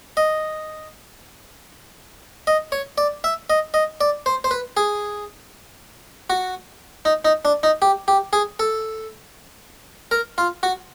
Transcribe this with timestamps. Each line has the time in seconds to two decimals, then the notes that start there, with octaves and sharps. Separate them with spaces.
0.17 D#5
2.47 D#5
2.72 C#5
2.98 D5
3.24 E5
3.50 D#5
3.74 D#5
4.01 D5
4.26 C5
4.44 C5
4.51 B4
4.77 G#4
6.30 F#4
7.05 D#4
7.25 D#4
7.45 D4
7.63 D#4
7.82 G4
8.08 G4
8.33 G#4
8.60 A4
10.11 A#4
10.38 F4
10.63 F#4